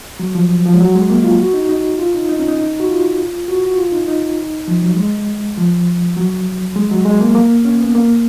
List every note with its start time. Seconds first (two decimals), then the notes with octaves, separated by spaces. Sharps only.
0.20 F#3
0.35 F3
0.65 F3
0.74 G#3
0.80 F#3
0.95 G#3
1.10 A#3
1.24 F4
1.39 F#4
1.54 D#4
1.69 D#4
1.99 F4
2.14 D#4
2.29 D#4
2.39 C#4
2.48 D#4
2.80 F#4
2.88 F4
3.48 F#4
3.63 F#4
3.78 F4
3.92 D#4
4.08 D#4
4.68 F3
4.82 F#3
4.96 G#3
5.57 F3
6.17 F#3
6.76 G#3
6.91 F#3
7.05 G#3
7.21 A#3
7.35 A#3
7.65 C#4
7.81 B3
7.95 A#3